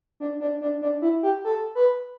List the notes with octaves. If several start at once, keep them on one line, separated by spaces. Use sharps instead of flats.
D4
D4
D4
D4
E4
G4
A4
B4